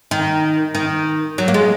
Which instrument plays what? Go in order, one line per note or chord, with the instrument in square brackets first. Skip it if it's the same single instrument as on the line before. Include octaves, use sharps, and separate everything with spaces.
[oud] D#3
D#3
F#3
A#3
G#3